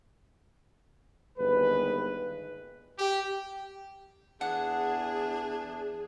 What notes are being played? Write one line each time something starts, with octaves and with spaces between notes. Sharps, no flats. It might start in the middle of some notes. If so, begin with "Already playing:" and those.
G1 D#2 D#3 G#3 B4
G4
E2 D4 G#4 F#5